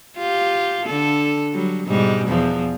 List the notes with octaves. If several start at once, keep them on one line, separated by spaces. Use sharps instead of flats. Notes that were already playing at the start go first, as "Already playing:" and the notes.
F4 G4
D3 A4
F#3 G3
G#2 B2 G3
E2 F3